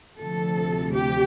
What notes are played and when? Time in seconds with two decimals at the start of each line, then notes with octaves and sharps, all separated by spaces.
0.18 D2 C3 F3 A4
0.93 G4